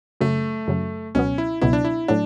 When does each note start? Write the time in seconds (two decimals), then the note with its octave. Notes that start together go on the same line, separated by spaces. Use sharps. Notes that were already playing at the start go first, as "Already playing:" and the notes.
0.21 F#2 C#3 F#3 A3
0.68 F#2 C#3 F#3
1.15 C#2 B2 F#3 B3 C#4
1.38 E4
1.61 C#2 B2 F#3 B3 E4
1.73 D4
1.85 E4
2.08 A2 F#3 D4